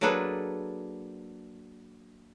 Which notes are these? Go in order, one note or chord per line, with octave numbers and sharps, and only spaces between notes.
F#3 A#3 D4 G#4 A4 B4